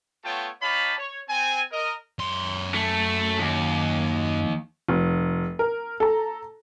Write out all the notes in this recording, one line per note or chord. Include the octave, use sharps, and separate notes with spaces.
A3 B3 F4 C#5 G5 A5
D#4 G4 C#5 F5 A5 B5
C#5
C4 G#5
A#4 D#5
F#2 C6
A3
D#2
F1
A#4
A4 A#5